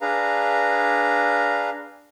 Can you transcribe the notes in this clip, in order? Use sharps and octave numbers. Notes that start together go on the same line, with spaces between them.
D4 G#4 B4 F5 A#5